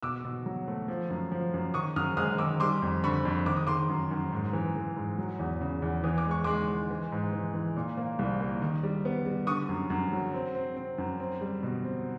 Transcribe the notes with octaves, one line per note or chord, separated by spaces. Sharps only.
B2 D6 E6
B2
F#3
A3
F3
F#2
F3
F#2
D#3 C#6 D#6
F#2 D#6 F6
G#3 D#6 F6
D#3 D6 E6
G3 C6 D6
F2
D3 B5 C#6
F2
D#3 D6
D#6
D#3 C6 D6
F#2
F#2
G#2
E3
E3
G#2
F#3
E2
C#3
E2
E3 D#6
D6
G#3
C#6
G#3 C6 D6
G#3
E3
G#2
E3
E3
A#2
A#3
C2
A#3
D#3
G3
B3
G3
D3 C#6 D#6
F#2
F#2
F#3
C4
C4
C4
F#2
C4
G3
B2
C4